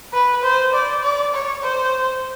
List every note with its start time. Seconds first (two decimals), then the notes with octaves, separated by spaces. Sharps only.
0.13 B4
0.43 C5
0.73 D5
1.03 D5
1.34 C#5
1.63 C5